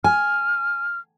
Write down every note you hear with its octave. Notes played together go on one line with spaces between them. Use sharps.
G#5 F6